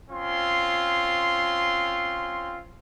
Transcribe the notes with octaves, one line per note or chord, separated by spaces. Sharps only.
C4 C#4 F4 C6